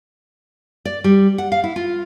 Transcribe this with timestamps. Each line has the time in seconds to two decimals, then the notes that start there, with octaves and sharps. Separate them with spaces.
0.85 D5
1.04 G3
1.38 F#5
1.52 F5
1.64 E4
1.76 F4